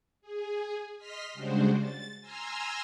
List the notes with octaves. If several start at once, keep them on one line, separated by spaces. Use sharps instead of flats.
G#4
D#5 C6 F6 B6
C#3 G3 G#3 D4 F#4 C5
A6
G#5 A#5 C6 E6 F6